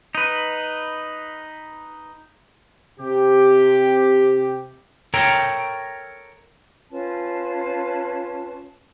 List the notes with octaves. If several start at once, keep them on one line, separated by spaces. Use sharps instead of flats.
D#4 B4
C3 G4
A4 A#4 C#5 G5 A#5
C#4 F4 B4 A5